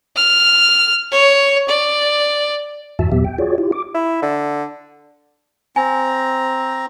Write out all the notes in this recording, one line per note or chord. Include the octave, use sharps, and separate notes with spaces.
F6
C#5
D5
F2 G#2 E3 F#4 E5 A5
D#2 A#2 F#3 B3 G4 E5
G5
F4 F#4 G#4 C#5 D5
E4 F4 G4
D6
E4
D3
C4 G#5 A#5